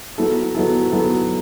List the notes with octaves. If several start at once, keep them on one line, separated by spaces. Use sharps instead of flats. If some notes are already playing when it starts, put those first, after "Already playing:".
F#3 B3 E4 A4
F#3 B3 E4 A4
F#3 B3 E4 A4